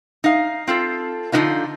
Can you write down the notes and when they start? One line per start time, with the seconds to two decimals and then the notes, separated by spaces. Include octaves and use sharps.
0.24 D#4 F5
0.67 C4 F4 A4
1.32 D3 F3 F#3 B3 D#4 F4